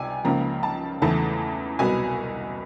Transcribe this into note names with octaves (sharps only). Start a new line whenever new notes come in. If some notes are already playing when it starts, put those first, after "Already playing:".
Already playing: C#2 C3 D5 G#5
C#2 C#3 F3 A#3 A#5
A5
E2 C#3 E3 A3 A5
C2 B2 F#3 B3 G#5